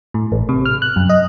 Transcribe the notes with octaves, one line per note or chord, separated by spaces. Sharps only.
A2
A1
C3
F6
F#6
F#2
D#5